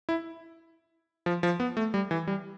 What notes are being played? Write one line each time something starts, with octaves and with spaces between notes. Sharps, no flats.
E4
F3
F3
B3
A3
G3
E3
G3